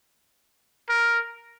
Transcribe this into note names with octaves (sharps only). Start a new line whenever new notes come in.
A#4